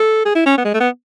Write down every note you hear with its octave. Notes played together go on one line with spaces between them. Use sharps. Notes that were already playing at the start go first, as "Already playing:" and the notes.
Already playing: A4
G#4
E4
C#4
B3
G#3
A3
B3